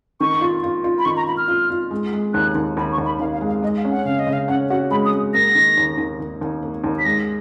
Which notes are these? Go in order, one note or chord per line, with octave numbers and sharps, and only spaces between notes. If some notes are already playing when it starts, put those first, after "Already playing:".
D#3 C#6
F4
F4
F4
B5
D#3 C#6
A#5
F4 B5
F6
F4
F4
G#3
G#3
D#2 F#6
D#2
D#2 B5
C#6
D#2
B5
D#2 F5
F5
G#3
F5
G#3 D#5
F5
C#4
F#5
C#3 F5
D#5
C#3
F5
C#4 F#5
F#4 F#5
G#3 B5
D#6
G#3
A#3 A#6
D#3
D#2
D#2
D#2
D#2
A#3
D#2
B6
G#3 A#6